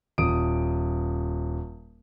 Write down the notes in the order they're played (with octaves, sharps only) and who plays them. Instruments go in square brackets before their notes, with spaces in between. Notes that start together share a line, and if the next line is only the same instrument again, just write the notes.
[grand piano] D#1 D#6 D7